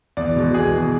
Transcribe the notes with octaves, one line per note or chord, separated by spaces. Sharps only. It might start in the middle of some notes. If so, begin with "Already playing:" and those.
E2 D5
B2 G#3
E2 G#4
B2 G#3